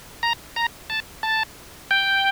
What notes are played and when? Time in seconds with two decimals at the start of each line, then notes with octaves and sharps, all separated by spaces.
0.23 A#5
0.56 A#5
0.90 A5
1.23 A5
1.91 G5